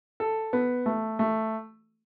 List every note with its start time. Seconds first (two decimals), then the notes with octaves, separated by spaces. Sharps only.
0.20 A4
0.53 B3
0.86 A3
1.19 A3